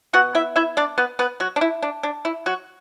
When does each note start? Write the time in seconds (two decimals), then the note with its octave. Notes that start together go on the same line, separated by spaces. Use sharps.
0.13 B2 B3 F#4 F#5
0.35 E4 E5
0.56 E4 E5
0.77 D4 D5
0.98 B3 B4
1.19 B3 B4
1.40 F#3 F#4
1.56 D4
1.61 E4
1.82 D4
2.03 D4
2.25 E4
2.46 F#3 F#4